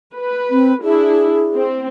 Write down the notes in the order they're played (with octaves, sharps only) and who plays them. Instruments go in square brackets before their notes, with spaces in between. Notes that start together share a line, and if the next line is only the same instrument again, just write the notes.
[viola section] B4
[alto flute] C4
[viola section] D4 E4 [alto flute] G#4
[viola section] C4